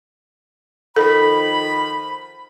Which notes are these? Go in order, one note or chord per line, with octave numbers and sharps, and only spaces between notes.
D#3 F3 A4 B5